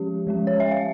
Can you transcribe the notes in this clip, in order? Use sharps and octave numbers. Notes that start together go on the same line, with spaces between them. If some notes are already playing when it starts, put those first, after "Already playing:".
Already playing: F3 G#3 C#4 G4
F3 G#3 C#4
C#5
E5
F5